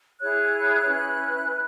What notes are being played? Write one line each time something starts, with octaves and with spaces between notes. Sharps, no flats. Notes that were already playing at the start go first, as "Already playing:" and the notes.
E4 G#4 C#5 F#6
C#4 E4 B4
E4 F#6